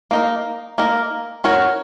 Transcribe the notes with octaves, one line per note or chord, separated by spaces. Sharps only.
A#3 D#4 A#4
A#3 D#4 A#4
C#4 F#4 A#4 C#5